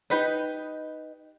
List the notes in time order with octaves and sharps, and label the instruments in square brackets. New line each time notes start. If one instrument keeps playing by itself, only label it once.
[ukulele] D#4 G4 B4 D#5